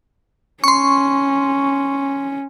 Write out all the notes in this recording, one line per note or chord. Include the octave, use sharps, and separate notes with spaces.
C#4 C6 C#6